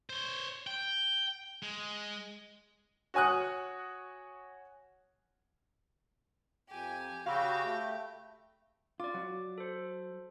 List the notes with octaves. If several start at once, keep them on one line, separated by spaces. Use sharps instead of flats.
C5 C#5
G5
G#3
F#4 C#5 G#5 D#6 F#6
F2 G4 G#5
C#3 F#4 G4 F5 G5 B5 E6
A3
F4 D5 D6
F#3
A4 C5